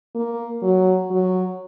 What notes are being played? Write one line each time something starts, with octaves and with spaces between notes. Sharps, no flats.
A#3
F#3
F#3